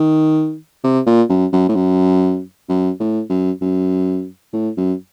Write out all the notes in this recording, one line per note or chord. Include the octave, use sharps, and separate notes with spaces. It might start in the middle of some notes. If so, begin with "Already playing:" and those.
Already playing: D#3
C3
A#2
F#2
F#2
A2
F#2
F#2
A2
F#2
F#2
A2
F#2